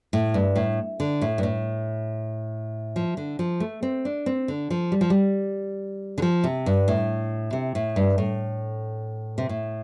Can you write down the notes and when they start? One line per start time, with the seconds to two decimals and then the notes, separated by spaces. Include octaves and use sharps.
0.13 A2
0.34 G2
0.56 A2
1.00 D3
1.21 A2
1.38 G2
1.43 A2
2.96 F3
3.17 D3
3.39 F3
3.60 A3
3.83 C4
4.05 D4
4.26 C4
4.48 D3
4.70 F3
4.92 G3
5.01 F3
5.10 G3
6.18 D3
6.22 F3
6.44 C3
6.66 G2
6.88 A2
7.53 C3
7.75 A2
7.96 G2
8.18 A2
9.38 C3
9.49 A2